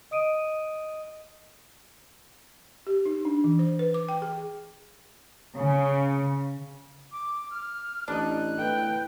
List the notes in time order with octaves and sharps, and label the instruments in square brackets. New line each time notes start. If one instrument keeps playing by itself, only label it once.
[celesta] D#5 D#6 D7 D#7
[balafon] G4
D#4
D4
E3
C5
B4
D6
G5
G#4
[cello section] C#3
[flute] D6
F6
[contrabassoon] A1 [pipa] D4 D#4 [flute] F#6
[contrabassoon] A2 [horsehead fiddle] B4 G5